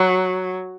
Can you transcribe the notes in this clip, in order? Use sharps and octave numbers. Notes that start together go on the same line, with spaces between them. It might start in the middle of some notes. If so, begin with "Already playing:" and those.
Already playing: F#3